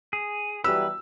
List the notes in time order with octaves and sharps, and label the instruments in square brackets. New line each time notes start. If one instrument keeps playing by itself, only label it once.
[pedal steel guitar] G#4
[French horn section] E3 F#3 G3 [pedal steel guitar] B4 [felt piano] E6